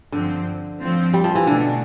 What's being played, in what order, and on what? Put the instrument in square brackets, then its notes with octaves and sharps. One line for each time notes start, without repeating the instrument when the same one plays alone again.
[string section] G2 F3 C4 [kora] D3
[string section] A2 F3 C4 F4
[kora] G3
F3
E3
[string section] B2 A3 D4 [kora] D3